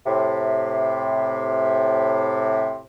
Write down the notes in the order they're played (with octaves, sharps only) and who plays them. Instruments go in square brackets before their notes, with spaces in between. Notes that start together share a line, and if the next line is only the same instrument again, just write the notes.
[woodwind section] A2 C3